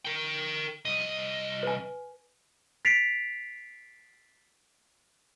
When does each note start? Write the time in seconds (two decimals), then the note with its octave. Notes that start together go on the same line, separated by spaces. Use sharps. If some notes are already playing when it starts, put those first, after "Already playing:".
0.05 A#4 G5
0.85 C2 D#5
1.63 B4 G#5
2.85 A6 B6 C7 D7 F7